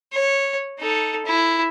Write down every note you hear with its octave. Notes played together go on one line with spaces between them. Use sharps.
C#5
D#4 A4
E4